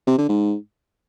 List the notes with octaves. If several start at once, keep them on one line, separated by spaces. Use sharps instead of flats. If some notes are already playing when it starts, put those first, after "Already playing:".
C3
D3
G#2